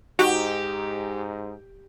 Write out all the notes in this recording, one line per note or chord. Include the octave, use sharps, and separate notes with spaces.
G#2 D#4 F#4 G4